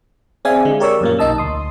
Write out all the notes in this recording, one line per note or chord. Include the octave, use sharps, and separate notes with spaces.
C4 G#4 D5 E5 F5 G#5
D3 G#3
G4 A#4 C#5 D5 C#6 E6
F#2 A#2 A#3
B1 D#4 D#5 A5 E6
D2 C6 D#6